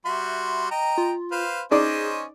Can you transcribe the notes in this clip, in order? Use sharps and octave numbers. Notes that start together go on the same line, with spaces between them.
G3 F#4 E5 C6
D#5 G5 A#5
F4
B4 C5 F5
C#4 D#4 G#4 C5 D5 D#5 D6